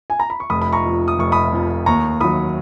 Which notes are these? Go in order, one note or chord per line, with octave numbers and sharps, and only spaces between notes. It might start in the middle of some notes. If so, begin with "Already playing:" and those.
G#5
A#5
B5
C#6
F1 B5 D#6
B5
A#5 C#6
F2 F3
D#6
F1 C#6
B5 D#6
F2 F3
D#2 A#5 C#6
D#3 F#3 B5 D#6